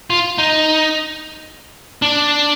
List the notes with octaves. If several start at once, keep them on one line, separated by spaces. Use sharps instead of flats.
F4
D#4
D4